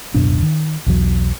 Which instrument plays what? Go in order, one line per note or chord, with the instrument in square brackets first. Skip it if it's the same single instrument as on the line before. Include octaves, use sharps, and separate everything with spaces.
[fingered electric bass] D1 F#2 B2 D4
D#3
B1 E2 F#3